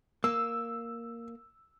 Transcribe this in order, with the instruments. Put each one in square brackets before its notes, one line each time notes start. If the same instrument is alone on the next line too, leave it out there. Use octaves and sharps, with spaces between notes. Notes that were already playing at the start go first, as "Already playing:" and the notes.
[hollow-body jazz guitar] A#3 [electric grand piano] E6